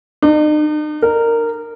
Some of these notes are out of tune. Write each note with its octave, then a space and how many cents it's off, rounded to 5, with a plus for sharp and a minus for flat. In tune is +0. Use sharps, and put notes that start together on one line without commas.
D#4 -45
A#4 -15